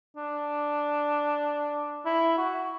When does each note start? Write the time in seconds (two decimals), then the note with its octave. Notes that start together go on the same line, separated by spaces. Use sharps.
0.17 D4
2.06 E4
2.38 F#4